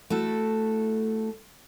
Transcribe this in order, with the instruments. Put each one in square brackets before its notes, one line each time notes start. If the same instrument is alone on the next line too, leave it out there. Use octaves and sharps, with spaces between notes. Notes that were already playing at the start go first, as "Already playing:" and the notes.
[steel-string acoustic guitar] A3 E4 F#4 A4